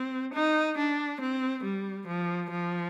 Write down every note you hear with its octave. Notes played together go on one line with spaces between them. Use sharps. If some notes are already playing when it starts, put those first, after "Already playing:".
Already playing: C4
D#4
D4
C4
G3
F3
F3